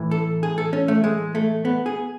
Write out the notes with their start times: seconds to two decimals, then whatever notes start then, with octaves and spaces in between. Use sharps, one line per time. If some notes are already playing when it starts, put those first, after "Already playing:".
Already playing: A2 E3
0.11 A4
0.43 G#4
0.58 A4
0.73 C#4
0.88 A3
1.04 G#3
1.35 A3
1.65 B3
1.86 G#4